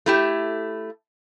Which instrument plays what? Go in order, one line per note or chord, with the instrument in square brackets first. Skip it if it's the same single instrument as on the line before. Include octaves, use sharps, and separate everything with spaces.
[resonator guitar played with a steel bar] A3 E4 G4